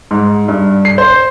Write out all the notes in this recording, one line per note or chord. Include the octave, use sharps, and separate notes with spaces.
G#2
G2
C7
C5